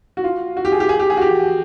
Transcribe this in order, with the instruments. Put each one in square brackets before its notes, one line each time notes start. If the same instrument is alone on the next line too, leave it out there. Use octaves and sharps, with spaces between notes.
[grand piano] F#4
F4
F#4
G4
G#4
G4
G#4
G4
G#4
F#4
G4